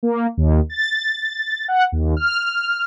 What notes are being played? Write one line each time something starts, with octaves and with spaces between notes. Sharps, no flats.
A#3
D#2
A6
F#5
D#2
F6